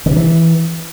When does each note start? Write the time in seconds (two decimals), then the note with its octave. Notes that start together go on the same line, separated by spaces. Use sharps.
0.06 D3
0.11 C3
0.16 E3